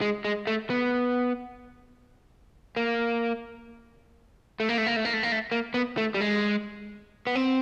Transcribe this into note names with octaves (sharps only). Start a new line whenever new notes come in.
G#3
G#3
A3
B3
A#3
A3
A#3
A3
A#3
A3
A#3
A3
A#3
A3
A#3
B3
A3
G3
G#3
B3
C4